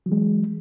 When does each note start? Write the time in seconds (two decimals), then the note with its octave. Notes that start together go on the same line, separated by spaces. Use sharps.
0.06 F#3
0.09 E3
0.12 G#3